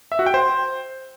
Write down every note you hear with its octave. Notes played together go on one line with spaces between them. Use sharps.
E5
F#4
G5
C5